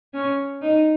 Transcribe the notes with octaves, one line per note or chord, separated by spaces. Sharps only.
C#4
D#4